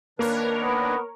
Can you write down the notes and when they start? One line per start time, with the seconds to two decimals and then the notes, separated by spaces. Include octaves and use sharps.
0.19 D#3 A#3 D4 A#4 B4 C#5
0.62 B3